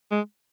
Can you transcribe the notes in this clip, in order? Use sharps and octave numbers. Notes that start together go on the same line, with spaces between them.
G#3